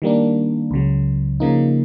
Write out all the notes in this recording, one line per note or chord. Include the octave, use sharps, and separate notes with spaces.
D#3 G3 A#3 D4
C#2 C#3 F#3
C#3 F3 A#3 D#4